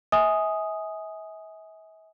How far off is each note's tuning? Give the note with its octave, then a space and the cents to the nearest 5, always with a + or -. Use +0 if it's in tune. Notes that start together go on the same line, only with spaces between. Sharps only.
E5 -40 G#5 +0 D#6 +0